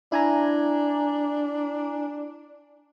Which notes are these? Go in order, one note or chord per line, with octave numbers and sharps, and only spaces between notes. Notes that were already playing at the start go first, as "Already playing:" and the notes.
D4 E4 G#5 A#5